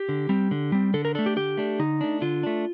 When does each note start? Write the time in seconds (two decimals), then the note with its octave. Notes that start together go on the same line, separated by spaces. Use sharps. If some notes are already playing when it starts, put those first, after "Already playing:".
Already playing: G4
0.09 D3
0.29 G3 C4
0.51 D3
0.72 G3 C4
0.94 D3 A4
1.05 A#4
1.15 A3 D4 A4
1.26 G4
1.36 D3 G4
1.57 A3 D4
1.79 D3 D#4
2.01 A3 D4
2.21 D3 F4
2.43 A3 D4